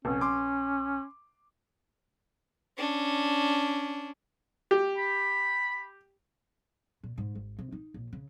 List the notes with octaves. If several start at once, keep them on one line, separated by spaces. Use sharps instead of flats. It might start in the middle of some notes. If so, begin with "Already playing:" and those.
F1 A#1 C#4
C6 D6
C#4 D4
G4
B5
A#2
G#2
G#1
C3
D#4
A#1
C#3